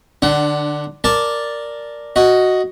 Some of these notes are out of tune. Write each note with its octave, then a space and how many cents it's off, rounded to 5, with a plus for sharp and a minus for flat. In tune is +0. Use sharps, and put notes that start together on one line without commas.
D3 +25 D4 +0 F#5 +25
A#4 +0 D5 +0 A5 +0
F#4 +0 D#5 +5